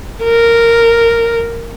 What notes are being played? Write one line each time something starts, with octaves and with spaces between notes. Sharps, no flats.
A#4